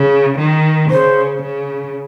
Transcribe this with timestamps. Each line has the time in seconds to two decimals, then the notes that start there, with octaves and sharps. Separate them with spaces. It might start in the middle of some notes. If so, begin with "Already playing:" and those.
Already playing: C#3
0.38 D#3
0.90 C#3 C5
1.42 C#3